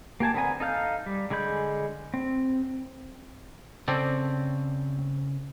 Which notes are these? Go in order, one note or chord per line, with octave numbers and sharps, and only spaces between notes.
A#3 G4 G#5 A5
D3 B3 C4 A#4 G#5
D#4 A4 F5 G6
G3
D3 G#3 G#4 B5 G6
C4
C#3 C4 A4 D5